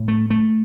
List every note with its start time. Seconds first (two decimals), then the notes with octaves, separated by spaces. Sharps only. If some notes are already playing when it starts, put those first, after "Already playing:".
Already playing: A2
0.08 A3
0.30 A3